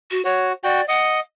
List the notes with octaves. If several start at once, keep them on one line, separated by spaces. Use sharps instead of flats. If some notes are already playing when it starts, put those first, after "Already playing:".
F#4
F#4 C#5
F#4 D5 G5
D#5 F#5